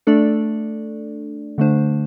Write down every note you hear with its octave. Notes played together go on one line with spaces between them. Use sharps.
A3 D4 A4 D5
D3 A3 D4 C5